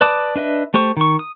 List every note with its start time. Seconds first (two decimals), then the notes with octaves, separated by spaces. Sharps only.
0.01 B4 D5 A5 D6 D#6
0.36 D4 B4 D#5 E5
0.74 A3 G4 C5 C#6
0.97 D#3 C#6
1.19 D#6